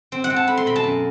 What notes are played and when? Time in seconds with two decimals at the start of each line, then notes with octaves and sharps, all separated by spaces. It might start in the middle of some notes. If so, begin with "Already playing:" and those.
0.12 C4
0.24 F#5
0.30 C4
0.36 A5
0.47 A3 B5
0.57 C6
0.66 B2 B5
0.76 A5
0.84 F#2